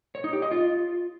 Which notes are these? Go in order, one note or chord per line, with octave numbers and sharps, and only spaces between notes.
C#5
D#4
G4
D#5
F4